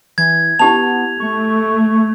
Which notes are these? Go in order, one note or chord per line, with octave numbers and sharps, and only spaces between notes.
E3 G#6
B3 E4 G4 A5 F7
A3 C#6